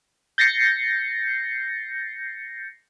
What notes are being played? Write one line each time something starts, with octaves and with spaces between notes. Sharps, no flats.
G6 A6 A#6 C7 C#7